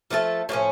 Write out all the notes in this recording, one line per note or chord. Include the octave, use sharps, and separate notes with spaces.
F3 A3 D4 A4
A2 F3 A3 C#4